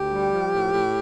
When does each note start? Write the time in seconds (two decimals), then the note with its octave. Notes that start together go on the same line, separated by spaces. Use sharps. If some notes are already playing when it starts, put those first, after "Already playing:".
Already playing: D2 G4
0.12 G3
0.32 F3
0.52 A2
0.72 A2